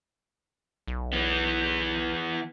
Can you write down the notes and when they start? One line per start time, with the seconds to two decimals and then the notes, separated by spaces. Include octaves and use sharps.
0.87 B1
1.13 E3 B3